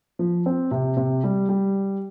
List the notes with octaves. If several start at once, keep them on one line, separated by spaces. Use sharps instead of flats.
F3
C4
C3
C3
G3
G3